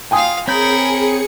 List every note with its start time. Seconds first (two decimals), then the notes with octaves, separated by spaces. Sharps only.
0.11 F4 F5 G5 G#5 D#6
0.48 C4 G#4 A#4 C#5 B5 G6 C#7